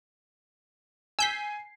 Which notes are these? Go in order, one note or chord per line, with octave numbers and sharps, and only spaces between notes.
G#5 E6 G6 B6 C7